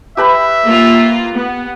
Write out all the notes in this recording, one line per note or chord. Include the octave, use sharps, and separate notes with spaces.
G4 B4 E5 B5
A#3 F4
B3